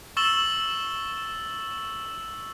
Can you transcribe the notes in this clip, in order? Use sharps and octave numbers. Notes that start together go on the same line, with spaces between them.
C#6 E6 A6 E7 F#7 G7